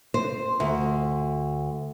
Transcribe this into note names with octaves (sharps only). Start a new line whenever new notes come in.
C5
D2